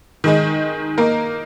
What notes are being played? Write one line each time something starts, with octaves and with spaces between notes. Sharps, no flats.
D#3 G#3 D#4
A#3 D#4 A#4